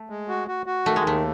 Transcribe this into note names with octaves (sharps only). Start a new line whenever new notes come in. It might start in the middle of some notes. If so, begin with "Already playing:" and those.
Already playing: A3
G#3
F#4
F#4
F#4
D#3 A3
G#3
D#2 A3